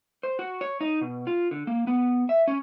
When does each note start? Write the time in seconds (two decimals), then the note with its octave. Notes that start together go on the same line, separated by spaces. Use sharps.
0.23 C5
0.39 F#4
0.61 C#5
0.81 D#4
1.01 B2
1.27 F4
1.51 D3
1.67 A#3
1.87 B3
2.29 E5
2.48 C#4